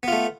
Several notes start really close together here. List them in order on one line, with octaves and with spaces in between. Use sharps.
B3 F4 A3